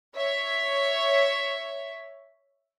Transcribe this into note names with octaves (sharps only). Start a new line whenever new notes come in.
C#5 E5